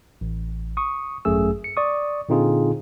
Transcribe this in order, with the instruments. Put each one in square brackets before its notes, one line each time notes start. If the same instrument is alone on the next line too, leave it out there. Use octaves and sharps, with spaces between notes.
[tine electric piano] A1
C#6 D#6
G#1 F#2 A3 G#4 E6
C#7
D5 C#6 D#6
A#2 D3 C4 D#4 F4 G#4